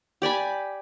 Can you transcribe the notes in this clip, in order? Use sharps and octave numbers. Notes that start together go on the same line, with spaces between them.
G4 D5 G#5 B5